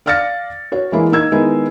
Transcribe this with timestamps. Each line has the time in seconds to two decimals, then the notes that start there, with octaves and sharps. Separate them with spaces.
0.06 D5 F5 F6 A6 A#6 C#7
0.72 F#4 C#5
0.92 E3 G#3 A#3 E4
1.11 A#3 D#4 E6 G#6
1.32 D#3 G#3 B3 D#4 E4